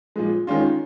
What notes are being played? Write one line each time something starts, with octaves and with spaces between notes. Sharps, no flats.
A#2 F3 G#3
D#3 G#3 C#4 F4